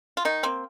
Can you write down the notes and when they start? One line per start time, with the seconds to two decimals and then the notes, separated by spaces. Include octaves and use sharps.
0.17 F4
0.25 D#3 D#4
0.43 A#3 C4